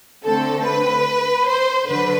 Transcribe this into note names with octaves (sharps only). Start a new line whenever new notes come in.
D3 A3 C4 A4
B4
C5
D3 F#3 B4